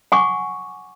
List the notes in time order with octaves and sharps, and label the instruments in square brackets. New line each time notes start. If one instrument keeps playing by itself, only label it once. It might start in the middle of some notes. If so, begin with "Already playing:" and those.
[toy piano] F#5 G#5 C#6 D6